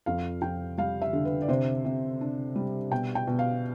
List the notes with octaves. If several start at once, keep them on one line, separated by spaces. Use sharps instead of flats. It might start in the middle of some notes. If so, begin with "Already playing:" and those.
F2 F5
F2 G5
G3 F5
E5
D3
B4
D5
C3 C5
C3
D4
G3
B2 G5
G5
B2
F5